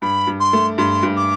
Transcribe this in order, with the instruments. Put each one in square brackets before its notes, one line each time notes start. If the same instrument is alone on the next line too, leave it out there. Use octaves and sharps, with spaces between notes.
[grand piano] G2 [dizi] B5
[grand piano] G2
[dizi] C6
[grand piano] A3
[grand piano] G2 [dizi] C6
[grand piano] G2
[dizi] D6